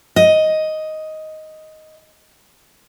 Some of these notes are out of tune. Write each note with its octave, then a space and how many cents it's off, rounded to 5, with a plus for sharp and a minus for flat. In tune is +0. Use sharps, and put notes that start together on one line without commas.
D#5 +5